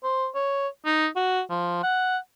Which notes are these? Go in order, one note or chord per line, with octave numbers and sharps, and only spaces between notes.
C5
C#5
D#4
F#4
F3
F#5